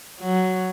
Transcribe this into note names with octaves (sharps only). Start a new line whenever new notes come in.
F#3